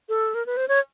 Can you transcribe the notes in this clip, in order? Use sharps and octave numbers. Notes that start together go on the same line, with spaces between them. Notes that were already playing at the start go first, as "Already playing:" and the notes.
A4
A#4
B4
C5
C#5